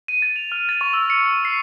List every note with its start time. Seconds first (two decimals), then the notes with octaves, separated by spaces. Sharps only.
0.08 D#7
0.22 A6
0.36 F7
0.52 F6
0.69 A6
0.81 C#6
0.93 E6
1.10 C#7
1.45 C7